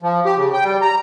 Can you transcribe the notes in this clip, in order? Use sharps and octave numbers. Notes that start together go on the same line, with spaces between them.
F3
G4
C#3
G5
G3
A#5